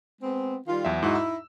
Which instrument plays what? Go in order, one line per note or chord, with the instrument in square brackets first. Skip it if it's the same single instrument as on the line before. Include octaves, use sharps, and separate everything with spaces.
[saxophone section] G#3 B3 C4
D#3 G3 F4
[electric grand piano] E2 F#3 E5
[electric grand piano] G#2 F#4 [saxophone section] D#4 E4
[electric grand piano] E6